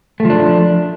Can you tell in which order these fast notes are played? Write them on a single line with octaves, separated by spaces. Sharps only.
A3 F3 D4